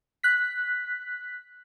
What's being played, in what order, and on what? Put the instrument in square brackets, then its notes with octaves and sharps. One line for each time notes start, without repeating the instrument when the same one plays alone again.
[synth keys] F#6 B6